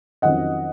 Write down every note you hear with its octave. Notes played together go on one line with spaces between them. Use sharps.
F2 D#3 F#3 C#4 D#5 F#5